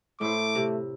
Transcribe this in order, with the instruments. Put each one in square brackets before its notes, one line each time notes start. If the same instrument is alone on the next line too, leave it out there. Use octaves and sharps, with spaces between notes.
[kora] A2 E4 C5 [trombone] A3 [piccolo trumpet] D6
[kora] C3